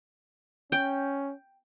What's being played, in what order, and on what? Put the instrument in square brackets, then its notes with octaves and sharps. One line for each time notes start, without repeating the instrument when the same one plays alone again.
[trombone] C#4 [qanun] G5